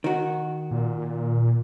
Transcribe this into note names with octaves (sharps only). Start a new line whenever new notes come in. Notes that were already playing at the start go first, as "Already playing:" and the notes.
D#3 F#4
A#2